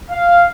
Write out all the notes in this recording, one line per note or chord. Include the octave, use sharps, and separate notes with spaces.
F5